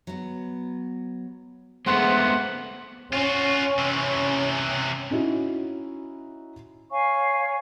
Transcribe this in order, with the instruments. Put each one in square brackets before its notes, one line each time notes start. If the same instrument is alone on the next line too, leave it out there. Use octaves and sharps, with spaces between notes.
[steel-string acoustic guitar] F#3 B3
[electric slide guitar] G#3 A3 B3 [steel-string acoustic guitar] D4 G#4 A#4 [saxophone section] C5 F#5
[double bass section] C#4 [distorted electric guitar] F4 F#4
[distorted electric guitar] C3 E3
[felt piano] C#4 D#4 E4 F#4
[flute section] C#5 F5 G#5 C#6